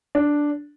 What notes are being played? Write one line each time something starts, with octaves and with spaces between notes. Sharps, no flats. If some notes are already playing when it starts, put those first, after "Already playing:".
D4